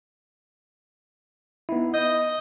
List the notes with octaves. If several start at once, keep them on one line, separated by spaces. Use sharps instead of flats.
B3 D#4 E4
D#5 D#6 G6